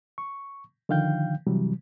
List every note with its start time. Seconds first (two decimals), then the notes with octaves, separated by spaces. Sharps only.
0.18 C#6
0.89 D3 D#3 F3 F5 G5 G6
1.47 C3 E3 F#3 G3